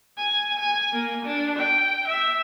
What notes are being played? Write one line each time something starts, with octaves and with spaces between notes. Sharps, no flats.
G#5
G#5
A#3
D4
G5
E5